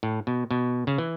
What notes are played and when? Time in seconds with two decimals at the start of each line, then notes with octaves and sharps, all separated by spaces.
0.03 A2
0.27 B2
0.51 B2
0.87 C#3
0.98 E3